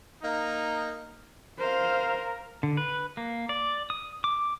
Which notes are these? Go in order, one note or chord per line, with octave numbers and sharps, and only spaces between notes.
A#3 D#4
A#4 C5 F5
D3
B4
A#3
D5
D#6
D6